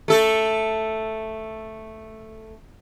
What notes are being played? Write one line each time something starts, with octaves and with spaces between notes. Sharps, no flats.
A3 A4